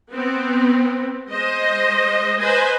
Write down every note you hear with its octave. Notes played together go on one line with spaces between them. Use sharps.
B3 C4
G#3 C5 D#5
B4 C5 D#5 G#5